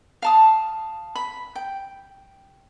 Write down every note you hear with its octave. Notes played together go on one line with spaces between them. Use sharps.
F5 A5 D#6
B5
G5